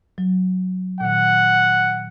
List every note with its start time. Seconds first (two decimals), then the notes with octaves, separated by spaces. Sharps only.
0.18 F#3
1.00 A#2 D#3 F#5